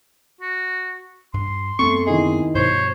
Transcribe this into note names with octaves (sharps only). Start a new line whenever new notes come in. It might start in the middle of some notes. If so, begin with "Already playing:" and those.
F#4
G2 C6
F#2 A3 B3 C4 C#6
D#3 E4 G#4 D#5
G2 B2 F3 C5 C#5